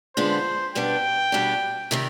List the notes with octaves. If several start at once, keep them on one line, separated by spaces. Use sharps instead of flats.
D3 F3 G#3 B3 D4 C5
B2 G3 B3 D4 G5
B2 G3 B3 D4
C3 D#3 G3